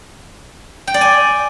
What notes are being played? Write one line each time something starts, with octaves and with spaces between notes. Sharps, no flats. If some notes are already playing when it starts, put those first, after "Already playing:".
G5
D5
G#5